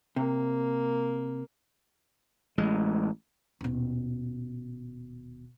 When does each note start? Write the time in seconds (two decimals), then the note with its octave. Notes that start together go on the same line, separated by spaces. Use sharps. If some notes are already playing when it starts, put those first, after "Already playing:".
0.16 C3 A#3
2.58 A1 G#3
3.61 D#1 B2